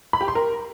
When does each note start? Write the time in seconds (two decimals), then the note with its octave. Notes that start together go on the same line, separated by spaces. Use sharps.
0.13 B5
0.21 G4
0.28 C6
0.35 A#4